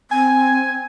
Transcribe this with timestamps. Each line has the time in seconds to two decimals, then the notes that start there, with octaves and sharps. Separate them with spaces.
0.11 C4 G#5